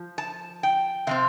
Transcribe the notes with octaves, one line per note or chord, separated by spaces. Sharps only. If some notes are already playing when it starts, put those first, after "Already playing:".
Already playing: F3
A5
G5
C3 F3 C4 F5